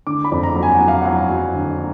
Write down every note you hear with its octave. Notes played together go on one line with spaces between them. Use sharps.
D3 D6
B5
F2
A#5
F#3
G#5
F#5
F#3
F5
F#3 F#5
F#3
D3
F#3